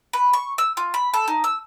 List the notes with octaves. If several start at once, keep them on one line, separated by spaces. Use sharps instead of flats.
B4
C#6
E6
F4
B5
A4
D#4
E6